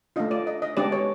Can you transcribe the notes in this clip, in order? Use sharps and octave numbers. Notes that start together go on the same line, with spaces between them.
A3 D4 F4 D#5
D5
D#5
D#5
G#3 B3 D4 G4 D5
C#5